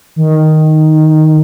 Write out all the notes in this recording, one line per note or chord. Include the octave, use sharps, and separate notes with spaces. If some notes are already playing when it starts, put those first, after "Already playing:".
D#3